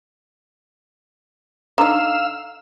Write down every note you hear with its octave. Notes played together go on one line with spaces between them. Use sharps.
D3 D#4 F5 A#5 E6